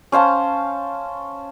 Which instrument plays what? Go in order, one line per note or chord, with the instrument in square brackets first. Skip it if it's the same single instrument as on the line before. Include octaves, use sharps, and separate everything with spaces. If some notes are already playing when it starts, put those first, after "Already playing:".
[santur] C#4 C5 F5 A5